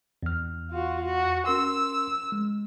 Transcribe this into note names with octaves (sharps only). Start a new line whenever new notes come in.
E2 F6
F4 F#4
F#4
C#4 A#4 C6 E6
G#3